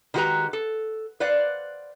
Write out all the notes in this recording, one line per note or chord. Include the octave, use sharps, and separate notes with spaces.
D#3 G#3 F#4 G4 B4 A#5
A4
B4 C5 D5 F5 F#5